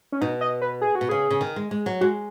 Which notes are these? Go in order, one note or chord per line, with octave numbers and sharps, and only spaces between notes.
C#4
B2 D#4
D#5
B4
G#4
F#4
B2
C#3 G#4
C#3
D#3
G#3
G#3
F#3
G#3 F#4